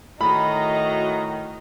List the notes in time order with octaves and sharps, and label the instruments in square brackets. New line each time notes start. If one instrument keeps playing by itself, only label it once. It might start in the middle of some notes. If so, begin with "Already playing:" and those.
[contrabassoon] A2 [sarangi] D#3 [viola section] F#4 D#5 A#5 [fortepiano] B5